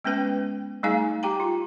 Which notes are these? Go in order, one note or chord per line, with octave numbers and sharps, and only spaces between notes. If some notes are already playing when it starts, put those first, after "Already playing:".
G#3 B3 C#4 B4 G5
G3 A3 D#4 G#4 F5 G#5
G4 G5 A#5
F4